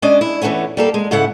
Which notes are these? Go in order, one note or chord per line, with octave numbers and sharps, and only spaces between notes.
G#3 C#4 D4 D5 D#5
E4
E3 F3 A3 B3 C#4
G3 A#3 A4
G#3
G#2 C#3 E4 A4 F#5